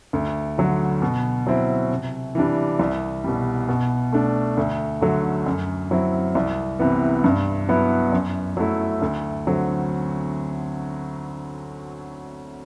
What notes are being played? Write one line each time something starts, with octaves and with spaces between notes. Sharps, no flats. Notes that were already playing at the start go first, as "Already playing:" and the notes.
D2
D3 F#3
B2
F#3 C4 E4
C3
E3 G3 D4
C2
B2 G3
B2
A3 D4
D2
D3 F#3 A3
F#2
F#3 C4 E4
C2
C3 E3 B3
G2
F#3 B3 E4
F#2
F#3 A3 E4
D2
D3 F#3 C4